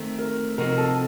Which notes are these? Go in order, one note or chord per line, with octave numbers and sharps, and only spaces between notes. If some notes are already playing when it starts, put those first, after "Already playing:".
Already playing: D#3 A3 C4
A#4
C3 F3 C4 D#4 F#4 A#4
A4